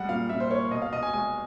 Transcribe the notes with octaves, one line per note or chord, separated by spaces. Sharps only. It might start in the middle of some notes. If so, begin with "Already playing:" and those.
Already playing: G3 G#3 F#5
A#2 F5
A#2 E5
C5
A#3 C#5
B2 D#5
F5
B2 D#5
G#5
G#3 G#5